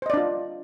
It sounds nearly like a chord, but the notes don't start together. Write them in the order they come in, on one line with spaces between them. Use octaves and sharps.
C5 D#5 D5 D4 F4